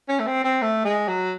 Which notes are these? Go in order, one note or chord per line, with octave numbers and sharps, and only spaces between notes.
C#4
A3
C4
C4
A3
G#3
F#3